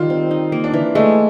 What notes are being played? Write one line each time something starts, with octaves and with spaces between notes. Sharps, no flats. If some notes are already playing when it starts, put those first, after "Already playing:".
Already playing: D#3 G3 F4
C4
D#4
A#3
D4
E3
G#3 A3